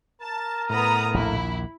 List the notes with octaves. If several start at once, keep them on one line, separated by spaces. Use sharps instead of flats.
A#4 A5
A2 B3 A#5 D#6
A#1 D#2 A#2 E4